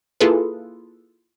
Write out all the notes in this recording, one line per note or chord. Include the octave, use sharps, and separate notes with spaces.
A#3 E4 F4 G#4 A4 B4